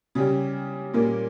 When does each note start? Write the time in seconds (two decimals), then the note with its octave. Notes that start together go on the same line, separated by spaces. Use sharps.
0.15 C#3 G3 C#4 G4
0.93 A#2 G3 A#3 C#4